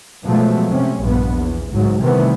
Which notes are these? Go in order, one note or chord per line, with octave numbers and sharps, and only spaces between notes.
B2 F3 F#3 G#3 A3
C3 C#4
A#1 G2 B3
E2
C#2 G#2 F#3
C3 D#3 E3 G3 A3 B3